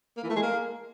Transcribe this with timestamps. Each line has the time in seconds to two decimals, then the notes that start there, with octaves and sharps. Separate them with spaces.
0.17 A#3
0.23 E3
0.30 A3
0.36 G#3
0.42 A#3